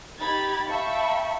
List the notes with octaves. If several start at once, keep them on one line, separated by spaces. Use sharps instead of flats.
D#4 G4 B5 G#6 A6
E5 F5 G5 A5 B5 C#6